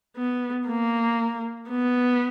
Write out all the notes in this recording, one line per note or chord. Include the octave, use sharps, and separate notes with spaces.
B3
A#3
B3